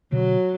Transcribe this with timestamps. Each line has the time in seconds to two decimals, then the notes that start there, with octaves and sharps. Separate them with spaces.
0.12 B2 D3 F#3